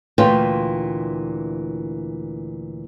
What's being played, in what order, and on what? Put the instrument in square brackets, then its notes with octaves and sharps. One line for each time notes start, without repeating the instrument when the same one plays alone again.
[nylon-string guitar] D2 A#2 E3 F4 G5